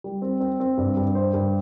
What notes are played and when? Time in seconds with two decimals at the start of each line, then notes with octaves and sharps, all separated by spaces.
0.04 G3
0.22 C4
0.40 C4
0.60 C4
0.77 G2
0.97 G2
1.15 C5
1.34 G2